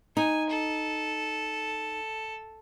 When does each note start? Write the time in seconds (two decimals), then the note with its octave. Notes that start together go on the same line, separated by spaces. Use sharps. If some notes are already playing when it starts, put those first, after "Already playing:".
0.17 D#4 G#5
0.50 A4